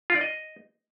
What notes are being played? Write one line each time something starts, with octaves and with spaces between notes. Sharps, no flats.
F4
D5
D#5